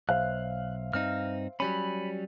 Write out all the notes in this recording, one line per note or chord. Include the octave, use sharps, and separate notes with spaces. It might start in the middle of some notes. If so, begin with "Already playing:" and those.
B1 C5 E5 F5 F#6
G2 C4 D#4 F6
F#3 G3 C#4 B5